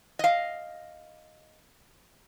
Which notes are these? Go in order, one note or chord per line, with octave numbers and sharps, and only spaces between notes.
D#5 F5